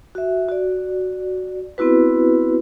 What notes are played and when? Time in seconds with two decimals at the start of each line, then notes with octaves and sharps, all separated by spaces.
0.15 F#4 E5
0.49 F#4 D5
1.78 B3 C4 E4 F#4 B4